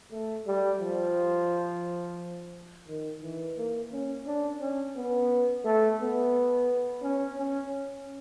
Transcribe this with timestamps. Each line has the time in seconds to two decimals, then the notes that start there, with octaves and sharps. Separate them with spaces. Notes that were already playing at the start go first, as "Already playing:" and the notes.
0.12 A3
0.47 G3
0.81 F3
2.88 D#3
3.23 E3
3.57 A#3
3.92 C#4
4.26 D4
4.61 C#4
4.96 B3
5.65 A3
6.00 B3
7.02 C#4
7.38 C#4